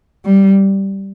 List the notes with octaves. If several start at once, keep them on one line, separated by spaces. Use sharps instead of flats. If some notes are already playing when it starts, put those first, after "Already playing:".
G3